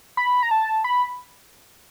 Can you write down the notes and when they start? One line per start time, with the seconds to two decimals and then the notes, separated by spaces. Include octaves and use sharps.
0.17 B5
0.43 A#5
0.51 A5
0.84 B5